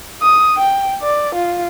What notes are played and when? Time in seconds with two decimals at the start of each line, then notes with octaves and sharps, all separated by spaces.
0.22 D#6
0.57 G5
1.02 D5
1.35 F4